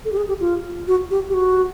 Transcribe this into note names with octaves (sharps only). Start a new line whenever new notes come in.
A4
G4
G#4
G4
F4
F#4
G4
G4
F#4